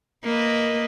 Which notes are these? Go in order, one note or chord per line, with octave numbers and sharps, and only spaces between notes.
A#3 B4 D#5